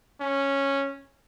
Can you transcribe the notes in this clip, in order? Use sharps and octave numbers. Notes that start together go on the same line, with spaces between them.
C#4